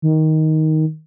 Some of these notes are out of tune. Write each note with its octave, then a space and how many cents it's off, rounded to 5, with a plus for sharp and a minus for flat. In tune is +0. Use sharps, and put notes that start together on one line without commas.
D#3 +10